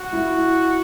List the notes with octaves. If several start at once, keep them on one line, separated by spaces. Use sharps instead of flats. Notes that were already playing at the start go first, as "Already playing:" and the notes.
Already playing: F#4
E4